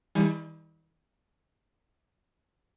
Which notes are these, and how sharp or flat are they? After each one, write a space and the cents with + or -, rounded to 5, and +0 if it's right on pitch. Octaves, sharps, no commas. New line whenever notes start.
E3 -45 G3 +30 G#5 +20